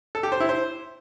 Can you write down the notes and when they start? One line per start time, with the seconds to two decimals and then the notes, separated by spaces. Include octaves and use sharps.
0.15 A4
0.23 G4
0.32 C5
0.40 E4
0.49 C5